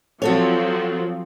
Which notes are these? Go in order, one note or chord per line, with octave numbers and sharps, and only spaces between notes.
F3 F#3 C4 F#4 A4 C#5